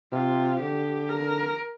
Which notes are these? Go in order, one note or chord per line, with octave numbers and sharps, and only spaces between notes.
C3 F4
D3 G4
A#4